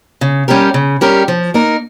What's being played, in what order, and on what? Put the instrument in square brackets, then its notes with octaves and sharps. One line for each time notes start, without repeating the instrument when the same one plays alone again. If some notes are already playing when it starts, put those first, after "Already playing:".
[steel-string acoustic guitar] C#3
G3 C#4 G4 A#4
C#3
G3 C#4 G4 A#4
F3
A#3 D#4 A#4